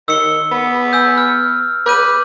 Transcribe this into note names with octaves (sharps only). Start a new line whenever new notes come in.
D#3 E6 C#7 G7
B3
G#5 E6 G6
F6
B4 D6 G6 D#7